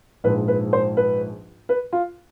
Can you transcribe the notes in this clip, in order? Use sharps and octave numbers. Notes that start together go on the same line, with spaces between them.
A#1 G#2 F3 G#3 B4
B4
C5
B4
B4
F4